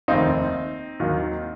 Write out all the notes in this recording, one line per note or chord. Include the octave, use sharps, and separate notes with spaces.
F1 D#2 D#3 C4 D#4
D#2 D#3 F#3